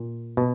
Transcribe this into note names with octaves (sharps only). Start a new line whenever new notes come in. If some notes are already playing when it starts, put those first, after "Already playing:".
Already playing: A#2
B2